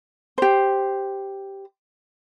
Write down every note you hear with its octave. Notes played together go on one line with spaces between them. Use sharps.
G4 C5